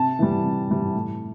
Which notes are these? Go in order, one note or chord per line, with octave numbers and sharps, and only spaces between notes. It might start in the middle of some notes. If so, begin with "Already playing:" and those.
Already playing: C3 A5
E3 G3
C3
E3 G3
A2